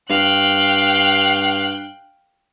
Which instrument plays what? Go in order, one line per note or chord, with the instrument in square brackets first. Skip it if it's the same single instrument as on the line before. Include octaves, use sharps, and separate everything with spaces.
[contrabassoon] G2 [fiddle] F5 [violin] G5 F#6